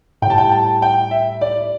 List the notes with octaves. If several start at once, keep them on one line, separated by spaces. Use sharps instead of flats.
A2 G5
G3 A5
G5
A5
G5
E5
D5